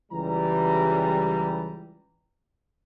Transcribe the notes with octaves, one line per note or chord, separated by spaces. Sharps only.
C#2 E3 G3 A#5